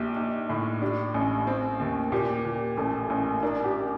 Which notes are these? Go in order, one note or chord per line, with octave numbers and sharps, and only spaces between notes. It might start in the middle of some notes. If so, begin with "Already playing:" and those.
Already playing: A#1 G4
D#4
A2
D4 G4
A1
C4
D#2
A#2 G4
A#2
A1 A4
A1
D4 A#4
G4